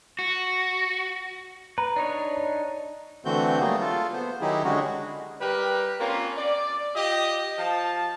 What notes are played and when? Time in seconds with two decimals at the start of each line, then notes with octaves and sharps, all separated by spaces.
0.19 F#4
1.78 B4 A#5
1.96 D4 D#4 C#5
3.25 D3 E3 A3 C4 F#4 G6
3.60 F#3 G3 A3 A#3 G#4
3.81 F4 A4
4.13 B3 C5
4.41 D#3 F#3 D#4 E4 G4 G#4
4.64 D3 G#3 C#4 F#4 G#4
5.41 G3 G4 A#4 B4
5.99 A#3 C4 C#4 F4
6.37 D5
6.96 F4 G4 D#5
7.58 F3 F5 A5